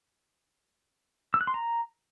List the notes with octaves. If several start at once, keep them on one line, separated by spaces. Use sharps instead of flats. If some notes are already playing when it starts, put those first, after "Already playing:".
E6
F#6
C6
A#5